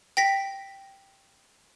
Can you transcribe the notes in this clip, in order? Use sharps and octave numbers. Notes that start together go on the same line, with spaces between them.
G5 A#6 B6